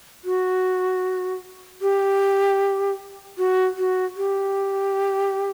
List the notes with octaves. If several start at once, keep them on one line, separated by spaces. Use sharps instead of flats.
F#4
G4
F#4
F#4
G4